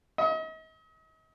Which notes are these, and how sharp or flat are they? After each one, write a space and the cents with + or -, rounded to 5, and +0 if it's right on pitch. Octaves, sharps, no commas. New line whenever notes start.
D#5 +40